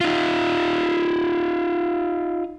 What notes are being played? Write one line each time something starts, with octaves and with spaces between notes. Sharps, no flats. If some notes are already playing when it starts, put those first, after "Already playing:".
D#4 F4